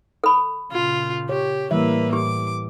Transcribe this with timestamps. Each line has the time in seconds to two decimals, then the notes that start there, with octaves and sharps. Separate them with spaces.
0.24 A4 B5
0.72 A#2 C#3 F4
1.29 G4 C#5
1.71 A2 E3 G3 A#3 B4 E5
2.13 G4 D6